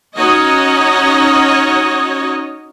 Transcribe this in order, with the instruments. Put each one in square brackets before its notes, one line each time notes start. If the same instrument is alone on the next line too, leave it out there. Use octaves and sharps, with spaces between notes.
[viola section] C#4 D#4 F#4 C#5 D#5